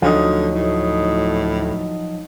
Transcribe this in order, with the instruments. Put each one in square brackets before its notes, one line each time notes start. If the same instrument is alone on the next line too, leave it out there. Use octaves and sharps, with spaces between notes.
[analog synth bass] D2 [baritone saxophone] D3 [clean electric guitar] F3 F#3 D#4
[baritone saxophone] A2